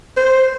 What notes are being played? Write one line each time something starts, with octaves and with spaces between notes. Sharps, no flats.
C5